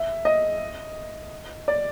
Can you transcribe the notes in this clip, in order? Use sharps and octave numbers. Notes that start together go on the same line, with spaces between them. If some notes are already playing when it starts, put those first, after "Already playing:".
Already playing: E5
D#5
D5